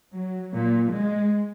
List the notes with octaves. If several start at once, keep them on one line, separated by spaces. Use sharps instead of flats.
F#3
A#2
G#3